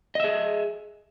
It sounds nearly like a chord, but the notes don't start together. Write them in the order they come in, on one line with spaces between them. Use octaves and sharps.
D#5 E5 G#4